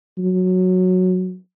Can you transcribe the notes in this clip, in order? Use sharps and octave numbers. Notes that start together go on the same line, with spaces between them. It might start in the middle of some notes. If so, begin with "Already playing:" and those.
F#3